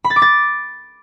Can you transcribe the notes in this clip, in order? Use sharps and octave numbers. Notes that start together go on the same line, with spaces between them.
B5
A6
D6
A6